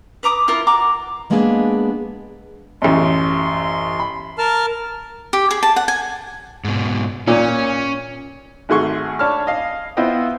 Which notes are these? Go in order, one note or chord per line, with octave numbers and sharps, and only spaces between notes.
B4 A#5 D6 D#6
E4 F4 A#4
F#4 A#5 D6
G3 G#3 A#3 B3 D4 G#4
A1 F#2 C6
B5
A#4 A5 F6
G4
G#4
A5
F#5
G#5
G#2 B2
A#2 C#4
G#1 A3 F#4 G#4 C6 C#6
D4 C#5 A5 B5 F6
D#5 F5
B3 E4 F4 C5 D#5 G5